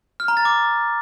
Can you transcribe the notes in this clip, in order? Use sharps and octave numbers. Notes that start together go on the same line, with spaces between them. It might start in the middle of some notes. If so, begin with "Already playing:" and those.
F6
A#5
A6
D6